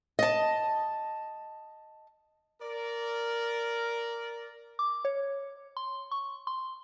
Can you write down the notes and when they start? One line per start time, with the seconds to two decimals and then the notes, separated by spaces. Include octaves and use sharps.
0.19 D#5 A5
2.62 A#4 D5
4.79 D6
5.05 C#5
5.77 C6
6.11 C#6
6.47 C6